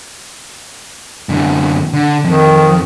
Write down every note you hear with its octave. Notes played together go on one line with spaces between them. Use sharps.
F#2 D3
D3
F2 D#3